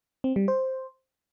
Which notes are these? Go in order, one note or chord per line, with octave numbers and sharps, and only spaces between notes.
C4
G3
C5